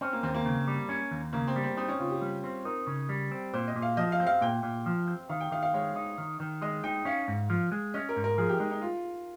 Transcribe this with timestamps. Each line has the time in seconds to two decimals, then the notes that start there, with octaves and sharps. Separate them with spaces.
0.01 C4 C#4
0.13 A#3
0.23 D#2 C4
0.34 A#3
0.45 C#3
0.67 G3
0.89 C#4
1.11 D#2
1.33 C#3 A#3
1.47 C4
1.56 G3
1.63 C4
1.77 C4 D#4
1.88 C#4
1.99 C#3 F4
2.10 G4
2.21 G3
2.44 C4
2.65 D#4 A#4
2.87 C#3
3.09 G3
3.32 C4
3.54 A#2 C5
3.68 D#5
3.76 A#2
3.82 F5
3.97 F3 D#5
4.12 F5
4.20 C4
4.27 F5
4.41 A#2 G5
4.63 A#2
4.86 F3
5.08 C4
5.29 D#3 F5
5.41 G5
5.52 D#3 F5
5.62 F5
5.74 G#3 C#5
5.96 D#4
6.18 D#3
6.40 D#3
6.62 G#3 D#5
6.84 D#4 G5
7.05 C#4 F5
7.28 G#2
7.50 F3
7.72 G#3
7.94 C#4 D#5
8.09 A#4
8.16 G#2
8.24 A#4
8.38 F3 G#4
8.49 G4
8.59 G#3 D#4
8.71 D#4
8.81 F4